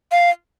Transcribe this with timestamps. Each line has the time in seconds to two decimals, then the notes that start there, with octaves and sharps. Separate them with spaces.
0.12 F5